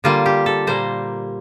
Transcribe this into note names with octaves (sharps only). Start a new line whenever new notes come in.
D3 G3 A#3 F4
G4
A4
A#2 G3 A#3 C5